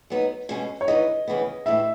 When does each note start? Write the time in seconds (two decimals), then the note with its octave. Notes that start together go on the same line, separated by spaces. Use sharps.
0.10 F#3 B3 D#4
0.49 B2 G#3 C#4
0.81 C#5
0.88 E3 B3 D#4 D#5
1.28 C#3 E3 B3
1.66 A2 E3 A3 E4 E5